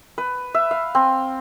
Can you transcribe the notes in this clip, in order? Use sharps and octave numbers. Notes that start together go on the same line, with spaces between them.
B4
E5
F5
C4